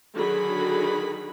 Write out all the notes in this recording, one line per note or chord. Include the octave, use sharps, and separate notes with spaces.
D3 D#3 F#3 F#4 G#4 B5